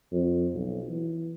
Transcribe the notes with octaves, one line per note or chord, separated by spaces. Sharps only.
F2
B1
E3